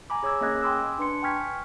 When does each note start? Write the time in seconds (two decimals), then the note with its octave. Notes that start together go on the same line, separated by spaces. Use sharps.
0.10 G#5 A#5 B5 D6
0.23 G#4 C#5 D6 E6 G#6
0.41 A#3 C#4 G#4 D#5 F#6 G#6
0.62 G5 G#5 B5 C6 D6 E6
0.98 D4 B4 C6 C#7
1.23 G5 G#5 C#6 F6 G#6 B6